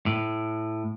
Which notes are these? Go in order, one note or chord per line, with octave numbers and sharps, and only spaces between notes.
A2